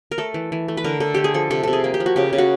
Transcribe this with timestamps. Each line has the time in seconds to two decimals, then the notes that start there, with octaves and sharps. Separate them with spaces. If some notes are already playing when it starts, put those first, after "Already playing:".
0.11 A#4
0.18 A3 A4
0.34 E3
0.52 E3
0.68 A3
0.77 B4
0.84 D3 A#4
1.00 D3 A4
1.14 A3 G4
1.24 G#4
1.34 F3 A4
1.50 C3 A4
1.63 C3 A4
1.73 G#4
1.84 A#3
1.94 G4
2.00 F3
2.06 F#4
2.16 C#3 G4
2.33 C#3
2.38 F#4